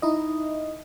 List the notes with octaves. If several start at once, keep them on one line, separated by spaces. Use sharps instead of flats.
D#4 E4 D#5